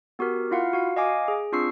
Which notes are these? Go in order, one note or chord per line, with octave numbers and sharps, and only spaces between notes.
B3 F#4 G4 A#4
E4 F4 F5 F#5 F6
F#4 F5
D#5 F5 G#5 D6
G#4
C4 D4 F4 C#6 E6 C7